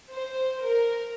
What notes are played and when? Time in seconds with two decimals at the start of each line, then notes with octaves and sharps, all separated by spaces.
0.14 C5
0.64 A#4